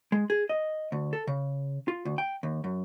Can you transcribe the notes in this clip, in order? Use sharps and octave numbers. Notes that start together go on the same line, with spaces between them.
G#3
G#4
D#5
D2
A4
C#3
F4
D2
G5
D#2
F#2